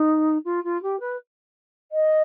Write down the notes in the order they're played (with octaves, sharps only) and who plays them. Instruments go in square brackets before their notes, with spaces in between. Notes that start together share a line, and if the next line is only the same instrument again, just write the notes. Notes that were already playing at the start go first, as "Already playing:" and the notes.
Already playing: [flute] D#4
F4
F4
G4
B4
D#5